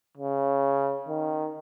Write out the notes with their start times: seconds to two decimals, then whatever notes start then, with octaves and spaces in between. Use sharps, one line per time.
0.17 C#3
1.09 D#3